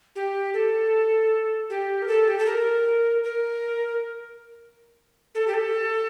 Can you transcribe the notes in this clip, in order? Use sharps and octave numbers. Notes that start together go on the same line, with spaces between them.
G4
A4
G4
A#4
A4
G4
A4
A#4
A#4
A4
G4
A4